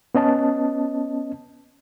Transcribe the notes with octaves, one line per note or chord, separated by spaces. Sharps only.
B3 C#4 D#5 A5